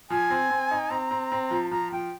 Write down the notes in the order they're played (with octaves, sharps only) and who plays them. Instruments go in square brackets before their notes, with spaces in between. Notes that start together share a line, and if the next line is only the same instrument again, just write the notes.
[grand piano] F3 [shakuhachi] G#5
[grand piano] C4
C4
D#4
[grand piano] C4 [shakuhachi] A#5
[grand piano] C4
C4
F3
[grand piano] F3 [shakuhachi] A#5
[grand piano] F3 [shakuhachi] G5